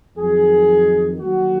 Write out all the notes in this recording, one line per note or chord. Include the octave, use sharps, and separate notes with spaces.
F2 D#3 F#3 G#4
D#2 D3 F#3 F#4